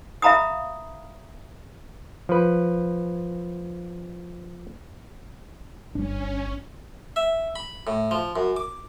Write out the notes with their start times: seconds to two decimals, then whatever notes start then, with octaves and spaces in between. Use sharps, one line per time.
0.22 E5 F5 A#5 B5 D#6
2.29 F3 B4
5.95 G1 G3 C#4 D4
7.16 E5
7.56 B5
7.87 A2
8.11 F3
8.36 F#2
8.56 D6